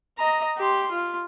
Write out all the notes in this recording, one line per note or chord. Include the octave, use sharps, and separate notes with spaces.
D#5 A#5
G4 C6
F4